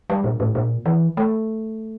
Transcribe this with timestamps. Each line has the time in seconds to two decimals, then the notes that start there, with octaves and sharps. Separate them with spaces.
0.10 G3
0.24 A#2
0.40 A2
0.55 A#2
0.86 E3
1.17 A3